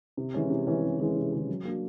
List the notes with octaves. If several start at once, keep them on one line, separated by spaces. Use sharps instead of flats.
C3
E3 G#3 C#4
C3
E3 G#3 C#4
C3
E3 G#3 C#4
C3
E3 G#3 C#4
F#3
A#3 D4 F#4